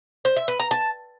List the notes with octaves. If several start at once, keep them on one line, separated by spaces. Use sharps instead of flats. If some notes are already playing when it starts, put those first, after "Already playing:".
C5
E5
B4
A#5
A5